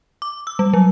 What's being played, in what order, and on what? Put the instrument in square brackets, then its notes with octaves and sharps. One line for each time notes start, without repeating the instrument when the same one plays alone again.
[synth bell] D6
E6
G3
F#3